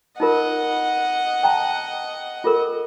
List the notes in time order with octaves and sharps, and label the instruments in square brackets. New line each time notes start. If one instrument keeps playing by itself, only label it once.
[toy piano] D#4 F4 A#4 [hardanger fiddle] D#5 F#5
[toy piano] G5 A5 A#5
F4 A4 A#4